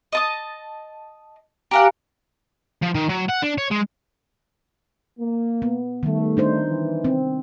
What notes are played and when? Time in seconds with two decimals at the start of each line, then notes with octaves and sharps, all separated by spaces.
0.13 D#5 A5 D#6
1.71 G4 A#4 F5 F#5 G#5 A#5
2.82 F3
2.95 D#3
3.10 F#3
3.29 F#5
3.43 D4
3.58 C#5
3.71 G#3
5.18 A#3
5.62 B3
6.03 D#3 G3 A3
6.37 D4 D#4 C5
6.67 E3
7.05 C4